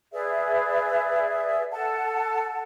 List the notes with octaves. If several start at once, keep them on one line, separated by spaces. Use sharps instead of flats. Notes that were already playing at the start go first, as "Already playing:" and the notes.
G#4 B4 D5 E5
A4 F#5 A5